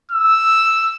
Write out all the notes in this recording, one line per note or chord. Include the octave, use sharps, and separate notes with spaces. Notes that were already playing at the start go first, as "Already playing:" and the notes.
E6